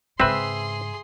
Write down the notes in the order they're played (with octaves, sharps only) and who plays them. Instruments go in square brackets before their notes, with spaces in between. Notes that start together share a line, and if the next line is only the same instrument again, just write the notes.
[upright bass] G#2 C#3 [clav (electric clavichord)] C4 B4 [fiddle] G#4 C6 [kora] E5